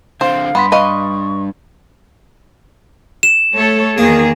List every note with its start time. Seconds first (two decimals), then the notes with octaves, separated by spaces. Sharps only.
0.21 D3 C4 C5 F5
0.55 G2 B3 B5 C6 B6
0.72 B4 D#5 F5 C#6
3.23 E7
3.55 A3 A4 C#5
3.98 E2 D#3 A#3 G#4